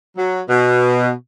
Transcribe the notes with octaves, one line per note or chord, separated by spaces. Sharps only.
F#3
B2